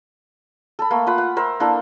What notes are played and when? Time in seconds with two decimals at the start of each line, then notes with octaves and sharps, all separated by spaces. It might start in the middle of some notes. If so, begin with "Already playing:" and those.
0.79 A4 B5
0.91 A3 A#3
1.07 F4 F#5 B5
1.18 F#5
1.36 A#4 C5 E5
1.60 A#3 D4 E4 A4